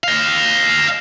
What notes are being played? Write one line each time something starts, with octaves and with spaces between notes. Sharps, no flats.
D#5 F5